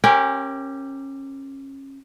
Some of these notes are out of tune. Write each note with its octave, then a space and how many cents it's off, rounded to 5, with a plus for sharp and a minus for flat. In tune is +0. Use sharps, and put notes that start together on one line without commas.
C#4 -25 G4 +0 A#4 +0